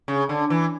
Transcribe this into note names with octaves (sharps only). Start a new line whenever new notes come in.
C#3
D3
E3